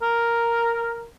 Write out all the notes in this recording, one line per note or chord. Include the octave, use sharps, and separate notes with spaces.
A#4